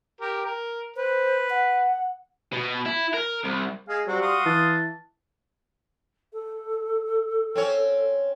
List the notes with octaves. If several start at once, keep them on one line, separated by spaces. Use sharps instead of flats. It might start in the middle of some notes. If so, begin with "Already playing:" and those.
G4 A#4
A#4
B4 C5
F#5
B2
E4
A#4
C2
G#3 G#4 F5
F#3 G3 C4 F#4
F5 C6 D#6
E3 A5
A4
C4 C#4 C#5